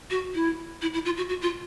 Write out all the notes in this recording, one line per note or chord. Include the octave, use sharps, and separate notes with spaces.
F#4
E4
E4
E4
F4
F#4
F#4
F4